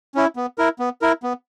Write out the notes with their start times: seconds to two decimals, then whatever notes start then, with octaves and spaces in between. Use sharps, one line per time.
0.15 C#4 E4
0.36 B3
0.58 E4 A#4
0.79 B3
1.02 E4 A#4
1.23 B3